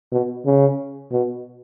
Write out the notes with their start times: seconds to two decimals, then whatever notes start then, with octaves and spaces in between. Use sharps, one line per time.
0.12 B2
0.46 C#3
1.12 B2